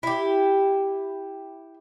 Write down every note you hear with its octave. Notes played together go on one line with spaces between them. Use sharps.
E4 G4